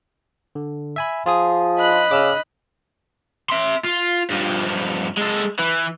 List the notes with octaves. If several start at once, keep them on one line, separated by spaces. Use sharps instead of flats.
D3
E5 G#5 B5
F3 F4 G#4 D#6
D#5 B5 F#6
C#3 D6 E6 F6
E5 C6
F4
G2 F3
G#3 A4
E3